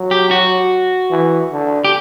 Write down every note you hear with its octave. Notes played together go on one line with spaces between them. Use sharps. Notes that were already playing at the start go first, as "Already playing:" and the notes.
Already playing: F#3
G4
F#4
E3
D3
G4